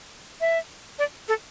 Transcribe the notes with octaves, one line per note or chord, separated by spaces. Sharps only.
E5
D5
A4